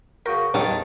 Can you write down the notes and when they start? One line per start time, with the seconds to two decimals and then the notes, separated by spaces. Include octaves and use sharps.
0.26 C#3 F#4 A#4 G5
0.54 E2 A#2 D#3 G3 C#5 D#5 A5